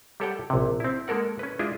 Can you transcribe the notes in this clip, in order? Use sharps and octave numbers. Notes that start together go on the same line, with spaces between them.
G3 G4 A4 C#5 F#5 G5
A#1 C3
C4 E4
G#3 A#3 A4 A#4 F#5
C#4 B4
G#3 D4 E4 F4 G#4